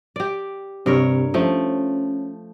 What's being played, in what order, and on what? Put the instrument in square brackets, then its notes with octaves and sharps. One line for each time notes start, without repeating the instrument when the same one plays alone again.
[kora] G4 D5
[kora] G2 A#4 C#5 [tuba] C3
[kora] F3 A3 [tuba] C#4